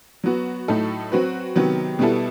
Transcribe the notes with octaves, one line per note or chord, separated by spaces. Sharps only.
F#3 B3 F#4
A2 F#3 A3 D#4 A4
F#3 C4 F#4 B4
C3 D#3 F#3 B3
B2 G3 B3 E4 A4